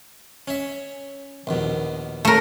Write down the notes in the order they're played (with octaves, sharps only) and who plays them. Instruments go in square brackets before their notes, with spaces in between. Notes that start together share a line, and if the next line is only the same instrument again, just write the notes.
[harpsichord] C#4 E5
A#1 D#2 B2
[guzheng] A3 A#4